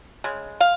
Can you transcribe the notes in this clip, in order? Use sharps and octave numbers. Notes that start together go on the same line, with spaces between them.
C#3 G#3
F5